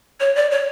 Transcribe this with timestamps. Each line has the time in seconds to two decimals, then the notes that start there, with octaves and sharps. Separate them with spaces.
0.20 C#5
0.36 D5
0.51 C#5